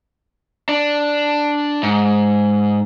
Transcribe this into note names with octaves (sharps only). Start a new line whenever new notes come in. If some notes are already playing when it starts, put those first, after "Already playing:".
D4
G#2